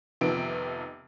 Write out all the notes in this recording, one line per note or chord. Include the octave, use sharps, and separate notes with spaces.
F1 C3 D#3 F3 B3 D7